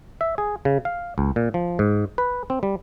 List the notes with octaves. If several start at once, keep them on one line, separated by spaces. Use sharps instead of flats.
E5
G#4
C#3
F5
C#2
A#2
F3
G#2
B4
C4
G3